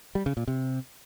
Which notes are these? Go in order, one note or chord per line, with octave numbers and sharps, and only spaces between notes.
G3
C#3
A#2
C3